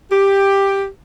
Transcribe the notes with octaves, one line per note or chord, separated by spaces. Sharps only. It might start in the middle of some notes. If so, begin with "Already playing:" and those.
G4